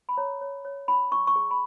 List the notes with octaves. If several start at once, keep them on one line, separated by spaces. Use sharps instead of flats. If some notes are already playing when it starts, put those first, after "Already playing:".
B5
C#5 A#5
C#5
C#5
D#4 B5
D#4 C#6
C#6
G#4
B5